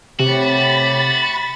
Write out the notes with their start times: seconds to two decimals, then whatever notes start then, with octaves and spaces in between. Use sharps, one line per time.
0.20 A2 C3 F#4 G4 B5 A6